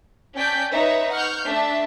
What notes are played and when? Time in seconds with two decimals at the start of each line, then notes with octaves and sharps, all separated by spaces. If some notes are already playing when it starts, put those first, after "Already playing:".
0.36 C#4 D5 G5 A5 G6 B6
0.72 D#4 B4 C#5 E5
1.15 F#5 C#6 F6 G6
1.47 A3 D4 E5 A5